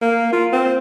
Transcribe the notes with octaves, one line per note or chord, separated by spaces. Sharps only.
A#3
F4
C4